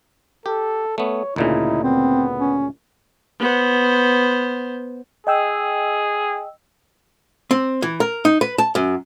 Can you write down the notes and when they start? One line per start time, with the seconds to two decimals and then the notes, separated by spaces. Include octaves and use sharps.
0.46 G4 A4
0.98 A3 B3 C#5
1.36 D2 A#2 C#3 D#4 E4
1.84 B3 C4
2.40 C#4
3.39 B3 C5
5.27 G#4 D#5 G5 E6
7.51 C4
7.82 E3
8.00 A#4
8.25 D#4
8.41 B4
8.58 A5
8.75 F#2